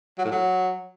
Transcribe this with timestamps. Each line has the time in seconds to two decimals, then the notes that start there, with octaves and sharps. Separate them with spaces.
0.18 F#3
0.25 A2
0.32 F#3